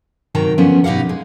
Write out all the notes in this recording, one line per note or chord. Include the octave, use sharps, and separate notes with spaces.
C3 D#3 F#3 G5 A#5
D3 F3 B3 C#4
B2 D#4 G4 F5 F#5
G#3